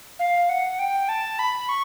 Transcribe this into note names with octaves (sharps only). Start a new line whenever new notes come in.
F5
F#5
G5
A5
B5
C#6